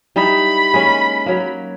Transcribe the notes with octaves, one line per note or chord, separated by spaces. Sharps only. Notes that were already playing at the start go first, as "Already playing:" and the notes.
G3 D#4 E4 B5
G#3 A#3 C#4
F#3 A#3